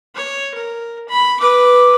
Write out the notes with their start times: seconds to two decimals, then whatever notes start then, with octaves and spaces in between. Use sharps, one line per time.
0.15 C#5
0.55 A#4
1.09 B5
1.40 B4 D6